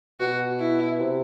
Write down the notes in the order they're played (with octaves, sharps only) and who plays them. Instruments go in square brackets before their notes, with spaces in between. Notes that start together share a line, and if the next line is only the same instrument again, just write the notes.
[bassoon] B2 [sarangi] F#4
[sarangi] E4
[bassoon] C3